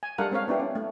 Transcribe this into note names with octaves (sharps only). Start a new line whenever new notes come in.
G#5
G3 D4 A4 A#4 F5 F#5
G#3 C4 A#4 C#5 F5
B3 D4 E4 G4
C#4
A3